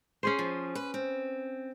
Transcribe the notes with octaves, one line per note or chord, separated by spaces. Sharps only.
C#4 G#4 C5
F3
B4
C4